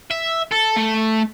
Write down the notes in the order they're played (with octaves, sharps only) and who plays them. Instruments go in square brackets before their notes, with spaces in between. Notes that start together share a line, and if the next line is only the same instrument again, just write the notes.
[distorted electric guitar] E5
A4
A3